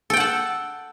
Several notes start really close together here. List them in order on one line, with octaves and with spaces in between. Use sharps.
A4 G5 F#5 A5